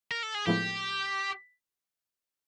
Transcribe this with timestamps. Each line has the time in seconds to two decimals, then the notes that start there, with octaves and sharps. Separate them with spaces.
0.11 A#4
0.23 A4
0.35 G#4
0.46 A2 F3 G#3 B3 E4 G4